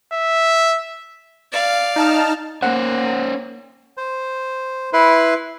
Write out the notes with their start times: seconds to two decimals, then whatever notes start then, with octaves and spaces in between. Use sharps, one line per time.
0.13 E5
1.52 D5 F5
1.96 D#4 A5 F6
2.62 A#3 C#4 C5 F#5
3.97 C5
4.93 E4 B4 C6